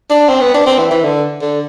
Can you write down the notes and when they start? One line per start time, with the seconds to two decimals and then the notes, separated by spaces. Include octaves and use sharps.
0.10 D4
0.29 C4
0.41 B3
0.54 D4
0.66 C4
0.79 E3
0.91 E3
1.04 D3
1.41 D3